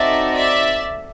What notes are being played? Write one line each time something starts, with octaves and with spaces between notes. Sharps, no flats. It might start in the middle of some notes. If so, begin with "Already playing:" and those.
Already playing: C4 D#4 F#4 A4 D5 E5
D5 E5